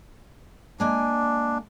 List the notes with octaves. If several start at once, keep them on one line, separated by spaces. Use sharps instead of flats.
G#3 A#3 D4 G#5